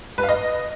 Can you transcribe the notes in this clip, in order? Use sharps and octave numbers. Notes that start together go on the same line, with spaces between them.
B4
F5
D#5